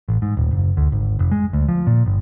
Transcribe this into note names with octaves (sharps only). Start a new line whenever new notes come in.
A1
G#2
D#1
F#1
D2
G#1
F1
G#3
D2
F3
A#2
G1